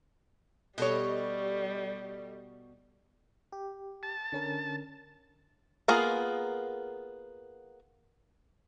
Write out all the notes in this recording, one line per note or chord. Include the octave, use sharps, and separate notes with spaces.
B2 G3 G4 A4 C#5 D#5
G4
A5
D3 C#4 A#4
A#3 B3 F4 G#4 A#4